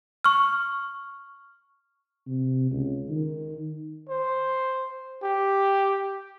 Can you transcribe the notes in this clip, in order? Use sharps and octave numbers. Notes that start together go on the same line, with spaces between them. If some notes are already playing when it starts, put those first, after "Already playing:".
C#6 F6
C3
C#2
D#3
C5
G4